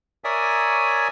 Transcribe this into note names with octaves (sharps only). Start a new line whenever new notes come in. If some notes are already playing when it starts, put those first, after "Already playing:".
A#4 C#5 D5 E5 G#5 D#6